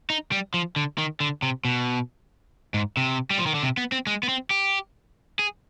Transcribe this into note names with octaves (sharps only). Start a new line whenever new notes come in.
D#4
G3
F3
D3
D#3
D3
C3
B2
G#2
C3
G3
F3
D#3
D3
C3
B3
C4
G#3
B3
C4
G4
G#4